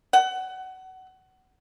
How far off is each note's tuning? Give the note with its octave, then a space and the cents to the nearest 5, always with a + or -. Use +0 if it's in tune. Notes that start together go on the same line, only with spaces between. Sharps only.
F#5 +25